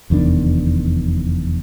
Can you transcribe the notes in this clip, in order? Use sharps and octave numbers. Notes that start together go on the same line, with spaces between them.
F1 E2 D#3 D4